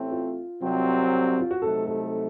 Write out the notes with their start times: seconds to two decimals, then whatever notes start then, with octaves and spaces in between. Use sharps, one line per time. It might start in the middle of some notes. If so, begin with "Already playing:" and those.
Already playing: A1 A2 A3 C4
0.11 F4
0.61 C2 C3 F#3 C4
1.40 F4
1.51 F#4
1.61 C2 C3 F#3 A3 D#4 A4
1.86 A4